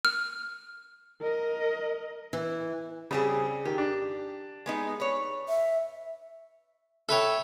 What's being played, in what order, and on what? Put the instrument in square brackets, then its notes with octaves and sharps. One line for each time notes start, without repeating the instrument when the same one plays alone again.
[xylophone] F6
[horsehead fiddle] A#4 D#5
[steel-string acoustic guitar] E3
[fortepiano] C#3 [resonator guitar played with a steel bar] G3 C4 G#4
[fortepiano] D#3 [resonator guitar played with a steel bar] G4
[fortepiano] D4
[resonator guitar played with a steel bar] G#3 B3 D#4
B4 C#5
[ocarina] E5
[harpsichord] A4 B4 C#5 [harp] E5 G5